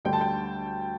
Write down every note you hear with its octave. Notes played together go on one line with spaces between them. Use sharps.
D2 D3 G3 G5
A5
G5